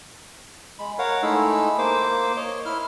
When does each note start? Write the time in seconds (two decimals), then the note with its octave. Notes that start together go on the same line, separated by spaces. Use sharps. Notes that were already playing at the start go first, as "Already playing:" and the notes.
0.79 G#3 B5
0.98 A#4 C#5 F5 F#5
1.23 G#3 A3 D#4 E4 E6
1.78 A#3 C5 D6
2.37 C#5 D#5
2.66 E4 F6